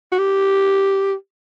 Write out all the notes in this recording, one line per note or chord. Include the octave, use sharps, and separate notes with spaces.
F#4
G4